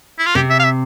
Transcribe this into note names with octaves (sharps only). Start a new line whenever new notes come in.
E4
F4
C3 G4
E5
F5
E5